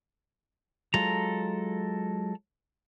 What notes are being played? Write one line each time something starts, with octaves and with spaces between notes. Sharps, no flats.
F#3 G#3 F4 A4 A#5